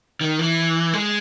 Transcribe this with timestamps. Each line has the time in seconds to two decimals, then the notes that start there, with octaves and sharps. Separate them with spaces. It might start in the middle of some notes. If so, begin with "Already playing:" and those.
0.21 D#3
0.39 E3
0.93 G#3